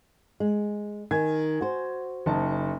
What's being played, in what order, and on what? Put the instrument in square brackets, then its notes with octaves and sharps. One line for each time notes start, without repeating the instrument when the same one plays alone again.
[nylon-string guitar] G#3
[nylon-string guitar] D#3 [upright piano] G#5 G#6
[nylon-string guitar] F#4 C5
[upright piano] F#1 D#4 A5